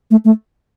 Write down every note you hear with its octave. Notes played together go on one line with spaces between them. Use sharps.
A3
A3